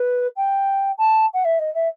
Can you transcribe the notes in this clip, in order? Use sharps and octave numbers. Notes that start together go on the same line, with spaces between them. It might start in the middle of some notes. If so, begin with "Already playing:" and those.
Already playing: B4
G5
A5
F#5
E5
D#5
E5